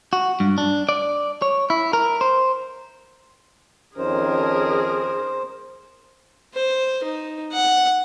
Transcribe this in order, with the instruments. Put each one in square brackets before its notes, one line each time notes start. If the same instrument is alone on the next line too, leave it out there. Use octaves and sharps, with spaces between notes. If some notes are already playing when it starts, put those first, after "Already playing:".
[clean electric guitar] F#4
G2
D4
D5
C#5
E4
A#4
C5
[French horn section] F2 D#3 C#4 [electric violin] G#4 A#4 [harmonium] C5
[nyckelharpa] C5
D#4
F#5